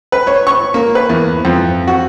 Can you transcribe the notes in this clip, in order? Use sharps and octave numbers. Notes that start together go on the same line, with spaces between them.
B4
C#5
C#6
A#3
B4
E2
F2
F#4